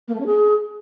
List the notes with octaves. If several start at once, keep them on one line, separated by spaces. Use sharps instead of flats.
A#3
A3
C#4
G#4